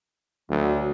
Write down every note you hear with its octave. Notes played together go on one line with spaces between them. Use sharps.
D2 F#3